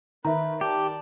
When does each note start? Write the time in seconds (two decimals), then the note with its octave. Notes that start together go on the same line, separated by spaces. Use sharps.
0.25 D#3 B4 E5 A#5
0.61 G4 D5 A5